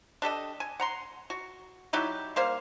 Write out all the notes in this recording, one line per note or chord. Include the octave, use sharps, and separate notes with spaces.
D4 G4 A4 D#5
G#5
F#5 A#5 C6
F#4
F#3 D#4 E4 G4
G3 A#3 C5 F5